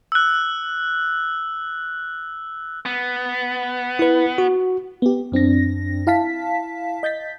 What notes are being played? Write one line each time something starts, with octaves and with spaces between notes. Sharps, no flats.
E6 F#6
B3
E4 B4
F#4
B3 G4
F#2 C4 D4 A#6
E4 F5 A5 B6
D#5 G6 A6 B6